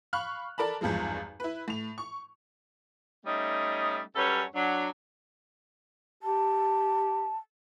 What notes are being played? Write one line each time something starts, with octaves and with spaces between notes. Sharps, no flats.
F5 B5 C#6 F6 F#6
A4 A#4 D5 A5 B5
G#1 E2 G2 F3 G#3
E4 B4
A2 F7
C#6
G3 A3 C#4 D#4 D#5
F#2 G3 C#4 A4 B4 C#5
F#3 D4
G4 A5